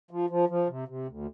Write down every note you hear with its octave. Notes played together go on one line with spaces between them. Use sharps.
F3
F3
F3
C3
C3
D2